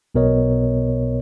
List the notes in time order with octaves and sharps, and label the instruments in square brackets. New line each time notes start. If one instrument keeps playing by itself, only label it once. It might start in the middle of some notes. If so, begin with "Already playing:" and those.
[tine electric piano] B1 B2 B3 A#4 C#5 D#5